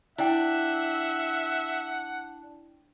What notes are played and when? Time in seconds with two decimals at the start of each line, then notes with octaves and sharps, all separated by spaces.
0.18 D4 E4 E5 F#5 G5